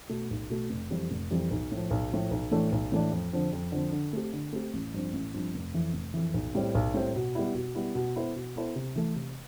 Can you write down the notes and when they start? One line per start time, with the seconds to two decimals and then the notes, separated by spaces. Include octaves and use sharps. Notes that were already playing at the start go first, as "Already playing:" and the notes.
0.09 B2 A3
0.31 B1
0.50 B2 A3
0.70 F1
0.90 F2 E3 G3 C4
1.11 F1
1.31 F2 E3 G3 C4
1.51 B1
1.72 A2 F3
1.91 B1
2.12 A2 F3
2.31 B1
2.51 A2 E3 A3 D4
2.72 B1
2.92 A2 E3 A3 D4
3.12 F2
3.33 D3 F3 C4
3.53 F2
3.72 D3 F3 C4
3.92 D3
4.13 A3 C4 G4
4.33 D3
4.53 A3 C4 G4
4.74 A1
4.94 G2 F3 C4
5.13 A1
5.34 G2 F3 C4
5.54 F1
5.74 F2 E3
5.94 F1
6.14 F2 E3
6.34 B1
6.55 A2 G3 C4
6.75 B1
6.94 A2 G3 C4
7.16 B2
7.35 G3 B3 E4
7.55 B2
7.75 G3 B3 E4
7.95 B2
8.16 B3 E4 A4 C5
8.36 B2
8.55 B3 E4 A4 C5
8.76 C3
8.96 E3 A3
9.16 C3